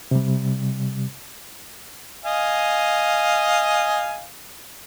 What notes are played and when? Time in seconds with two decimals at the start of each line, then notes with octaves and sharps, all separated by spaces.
0.11 C3 G3
2.24 D#5 F5 G#5